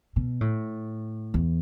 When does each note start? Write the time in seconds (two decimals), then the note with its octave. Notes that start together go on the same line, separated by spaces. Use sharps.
0.16 B2
0.41 A2
1.34 E2